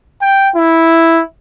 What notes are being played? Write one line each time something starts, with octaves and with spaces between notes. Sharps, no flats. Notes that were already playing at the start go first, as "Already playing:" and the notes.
G5
E4